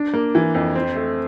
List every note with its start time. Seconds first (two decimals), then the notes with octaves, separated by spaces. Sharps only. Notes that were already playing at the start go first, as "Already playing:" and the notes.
Already playing: D4
0.13 A#3
0.35 E3
0.55 F2
0.75 C4
0.95 A3